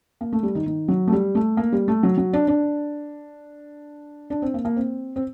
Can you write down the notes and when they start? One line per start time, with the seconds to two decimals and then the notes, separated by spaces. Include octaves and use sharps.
0.21 A#3
0.33 A3
0.43 G3
0.55 D#3
0.66 D#3
0.88 F#3
1.07 A3
1.12 G3
1.35 A3
1.57 A#3
1.72 G3
1.88 A3
2.03 F#3
2.18 F#3
2.33 D4
2.48 D4
4.30 D4
4.42 C4
4.54 A#3
4.65 A#3
4.76 C4
5.16 C4